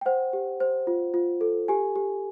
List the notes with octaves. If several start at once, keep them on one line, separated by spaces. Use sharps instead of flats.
G5
C5 F#5
G4
C5
F4
F4
A4
G4 G#5
G4